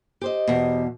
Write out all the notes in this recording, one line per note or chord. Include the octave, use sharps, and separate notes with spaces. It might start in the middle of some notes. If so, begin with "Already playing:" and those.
G4 C5 D#5
E2 B2